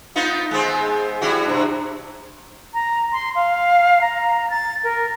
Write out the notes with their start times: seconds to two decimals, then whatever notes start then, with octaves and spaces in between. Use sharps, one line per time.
0.16 B3 D#4 F4
0.51 G#3 B3 C4
1.21 G3 E4 F#4
1.45 G2 C3
2.74 A#5
3.13 C6
3.35 F5
4.01 A#5
4.50 A6
4.84 A#4